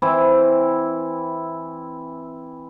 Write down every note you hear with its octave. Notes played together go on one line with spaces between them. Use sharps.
E3 C4 E4